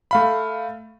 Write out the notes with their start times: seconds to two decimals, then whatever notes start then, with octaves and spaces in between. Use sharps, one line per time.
0.11 A3 F5 B5